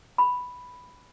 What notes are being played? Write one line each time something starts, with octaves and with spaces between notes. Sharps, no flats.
B5